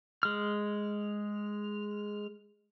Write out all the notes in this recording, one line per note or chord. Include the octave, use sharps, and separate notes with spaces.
G#3 F6